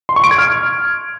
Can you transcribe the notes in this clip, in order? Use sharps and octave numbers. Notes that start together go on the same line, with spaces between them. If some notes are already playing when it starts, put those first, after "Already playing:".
C6
C#6
D7
G#6
F6